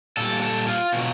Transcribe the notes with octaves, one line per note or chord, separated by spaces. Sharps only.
A#2 G3 A4
A4
F4
B2 F#3